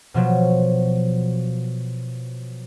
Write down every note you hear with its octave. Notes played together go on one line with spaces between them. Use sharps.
B2 F3 F#3